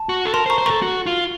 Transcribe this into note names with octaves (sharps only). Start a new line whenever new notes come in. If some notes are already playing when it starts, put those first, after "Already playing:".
Already playing: A5
F#4
A4
A#4 A5 C6
C5
A#5 C#6
C5
A4 A#4 A#5 C#6
F#4
F4